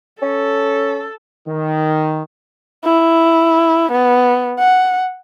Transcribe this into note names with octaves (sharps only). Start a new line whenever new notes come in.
C#4 A4
D#3
E4
B3
F#5